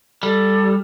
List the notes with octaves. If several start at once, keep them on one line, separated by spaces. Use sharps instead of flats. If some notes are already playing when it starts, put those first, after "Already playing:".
G3 A4